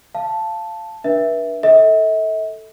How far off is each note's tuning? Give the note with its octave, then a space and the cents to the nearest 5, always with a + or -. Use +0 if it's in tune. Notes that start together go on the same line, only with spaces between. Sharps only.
F5 -15 A5 +0
D4 +0 B4 -40 E5 +0
A4 +5 E5 -45